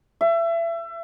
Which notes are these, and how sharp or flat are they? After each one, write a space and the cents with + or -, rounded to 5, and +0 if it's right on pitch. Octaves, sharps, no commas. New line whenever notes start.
E5 +30